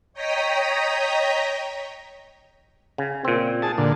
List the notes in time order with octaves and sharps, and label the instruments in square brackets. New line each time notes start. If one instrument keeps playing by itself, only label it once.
[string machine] C#5 D#5 G5 A#5 D#6 B6
[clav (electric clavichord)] C#3
A#2 C4
[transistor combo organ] G#4 A5
A#2 D3